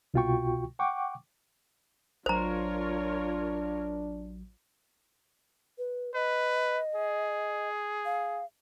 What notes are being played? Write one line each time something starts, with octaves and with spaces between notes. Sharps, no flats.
C2 B2 F4 F#4 G5 C#6
F#5 G5 C#6 D6
A1 F#3 D4 F4 A#4 C5 C#5 A#5
B4
B4 D#5
G#4
F5